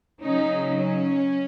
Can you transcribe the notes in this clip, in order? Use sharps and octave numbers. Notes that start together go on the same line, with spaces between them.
C#3 F#3 C#4 D#4
C#4